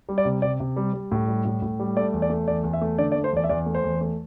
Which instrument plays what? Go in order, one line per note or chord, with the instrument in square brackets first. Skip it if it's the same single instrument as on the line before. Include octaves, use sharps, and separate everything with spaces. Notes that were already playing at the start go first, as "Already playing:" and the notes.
[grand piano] G3
D5
C3
C3 D5
C3
G3
G3
A2
G3
A2
A2
G3
A3 D5
E2
D5
A3
E2 D5
E2
E5
A3
D3 D5
D5
A3
C5
E2 D5
E5
E2 D5
A3
C5
E2
A3